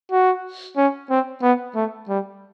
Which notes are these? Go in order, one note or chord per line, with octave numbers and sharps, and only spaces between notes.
F#4
C#4
C4
B3
A3
G3